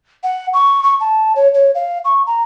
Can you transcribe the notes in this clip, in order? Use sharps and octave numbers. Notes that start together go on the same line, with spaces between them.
F#5
C#6
C#6
A5
C#5
C#5
F5
C#6
A#5